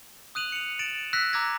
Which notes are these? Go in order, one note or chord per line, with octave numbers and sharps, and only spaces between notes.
D#6 F#6 D#7 F7 F#7
C#7 F7
A6 D7 E7 F#7
E6 F#6 A#6 B6
A#5 D6 E6 F#6 G#6 A#6